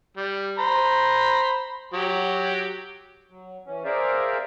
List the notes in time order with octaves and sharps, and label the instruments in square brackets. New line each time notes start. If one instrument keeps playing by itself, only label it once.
[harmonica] G3
C5 A#5 B5
F#3 G4
[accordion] F#3
E3 C#4
G#4 A#4 C5 D5 E5 F5